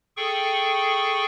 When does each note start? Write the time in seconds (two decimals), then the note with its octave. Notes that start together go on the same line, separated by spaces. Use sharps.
0.17 G#4 A4 G5 C#6